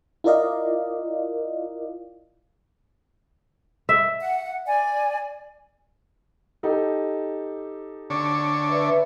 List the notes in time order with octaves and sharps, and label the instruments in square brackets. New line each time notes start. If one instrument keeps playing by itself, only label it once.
[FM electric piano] E4 F4 A#4 D5 D#5 F5
[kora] E5
[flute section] F#5
D5 G#5
[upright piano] D#4 G4 A4
[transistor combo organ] D3 D4 C#5
[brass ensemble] B4 D5 E5